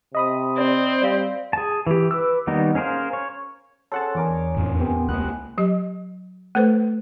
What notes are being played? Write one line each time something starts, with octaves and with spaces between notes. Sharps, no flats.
C3 D#5 B5 D#6
C4 D5
G3 D5 F5
G#4 A5
E3 G4
B4 D6 E6
D#3 G3 A#3 B3 D#4
C#4 G#4 A#4 C5 F5
C#5
C#4 G#4 A4 C5 C#5 F#5 A5
E2 D4 A#4 D6
F2 A2
B3 C4 G4 G#5
C#2 A#3 B3 D#5 F#6
F#3 G4 D#5
A3 A4 B4 C5